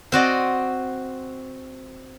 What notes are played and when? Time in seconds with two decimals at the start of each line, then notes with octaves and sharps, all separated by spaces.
0.12 C4 F#4 D5 D#5